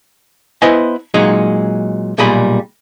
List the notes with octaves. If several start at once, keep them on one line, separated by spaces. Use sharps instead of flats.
B3 E4 B4 C5 D#5 G#5
A#2 F#3 G#3 D#4
B1 A#2 G3 G#4 B5